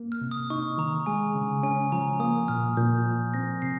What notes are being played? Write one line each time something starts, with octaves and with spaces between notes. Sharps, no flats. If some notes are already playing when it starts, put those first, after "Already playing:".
Already playing: A#3
F6
C3
D#6
D#4 C#6
D#3 A#5
G#3 G#5
C#3
C#4 G#5
F3 A#5
A#3 D#6
A#2 F6
A#2 G6
F3
C4 A#6
C3 C7